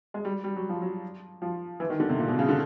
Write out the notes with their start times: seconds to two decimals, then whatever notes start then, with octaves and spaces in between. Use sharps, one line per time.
0.14 G#3
0.25 G3
0.44 G3
0.56 F#3
0.69 F3
0.82 F#3
1.42 F3
1.80 E3
1.90 D#3
2.00 D3
2.09 C3
2.19 A#2
2.28 B2
2.39 C#3
2.49 D3